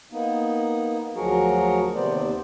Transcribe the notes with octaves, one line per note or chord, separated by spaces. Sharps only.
A#3 B3 D#4
D2 F3 F#3 F#4 G#4 A#4
D#2 C3 B3 C5 D5